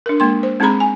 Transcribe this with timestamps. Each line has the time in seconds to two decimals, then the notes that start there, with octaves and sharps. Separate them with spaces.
0.06 D4 A#4
0.20 G#3 A#3 C6
0.43 C5
0.60 G#3 C4 D#4 G#4 A#5 B5
0.80 G#5